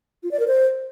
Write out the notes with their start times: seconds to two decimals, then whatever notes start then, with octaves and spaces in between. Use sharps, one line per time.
0.23 F4
0.31 D5
0.39 A#4
0.48 C5